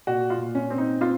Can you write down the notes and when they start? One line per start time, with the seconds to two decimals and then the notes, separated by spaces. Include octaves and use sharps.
0.07 A#2 F#4
0.30 F4
0.38 A#2
0.55 C#4
0.70 C4
0.78 D#4
1.01 C4 F4